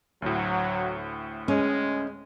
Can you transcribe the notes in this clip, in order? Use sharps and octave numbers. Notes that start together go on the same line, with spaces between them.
D2 A2 F#3
G#3 C#4